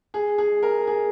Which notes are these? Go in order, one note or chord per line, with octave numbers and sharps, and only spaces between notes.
G#4
G#4
A#4
G#4